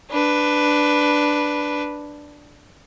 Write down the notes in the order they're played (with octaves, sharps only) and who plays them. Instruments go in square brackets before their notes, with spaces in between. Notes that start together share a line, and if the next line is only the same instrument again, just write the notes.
[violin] D4 B4